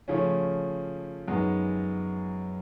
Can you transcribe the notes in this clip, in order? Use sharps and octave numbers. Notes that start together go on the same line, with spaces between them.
C#3 F3 A3 C#4
F#2 D#3 G#3 B3